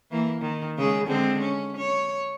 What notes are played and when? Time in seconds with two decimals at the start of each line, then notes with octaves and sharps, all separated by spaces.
0.11 E3 A#3
0.42 D#3
0.77 C#3 G#3 G#4
1.07 D3 G#3 C4
1.41 C#4
1.77 C#5